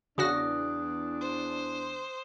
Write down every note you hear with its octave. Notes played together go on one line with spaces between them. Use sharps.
E2 C#3 D4 F#4 D#6 F#6 A#6
C5